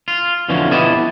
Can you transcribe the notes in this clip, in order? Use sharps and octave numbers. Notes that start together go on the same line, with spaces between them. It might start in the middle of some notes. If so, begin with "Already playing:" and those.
F4
F2 B2 D3 E3 F3 C#4
B3 E4 G4 D#5 A5